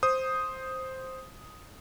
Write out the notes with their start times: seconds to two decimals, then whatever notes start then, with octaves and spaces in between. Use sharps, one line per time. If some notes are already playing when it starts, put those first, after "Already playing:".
0.03 C5 D#6